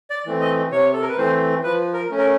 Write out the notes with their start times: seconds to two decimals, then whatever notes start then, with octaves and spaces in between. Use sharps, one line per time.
0.10 D5
0.26 E3 A3 C4
0.41 D#5
0.71 C3 C#5
0.93 A4
1.01 A#4
1.09 B4
1.17 E3 A3 C4 C5
1.63 F3 B4
1.94 A#4
2.10 A3 C#4
2.18 A#4